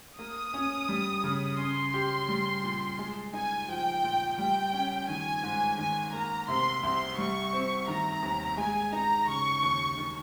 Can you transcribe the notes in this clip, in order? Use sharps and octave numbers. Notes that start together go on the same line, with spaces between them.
A#3 D#6
C#4
G3
C#3
C#4 C6
G4
G3
A#2
G#3
D#4 G#5
F3 G5
A#2
G3 G5
C#4
D#3 G#5
G#2
D#3 G#5
A#3 A#5
C3 C6
C2 C6
G3 C#6
C4
D#3 A#5
D#2
G#3 G#5
D#4 A#5
C#3 C#6
D#2
D#3